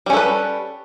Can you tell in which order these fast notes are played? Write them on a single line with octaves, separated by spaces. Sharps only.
G3 C#4 A4 B4